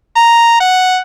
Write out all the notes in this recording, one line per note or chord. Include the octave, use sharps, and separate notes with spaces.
A#5
F#5